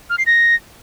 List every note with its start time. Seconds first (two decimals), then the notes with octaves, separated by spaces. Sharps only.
0.10 F6
0.18 C7
0.26 A#6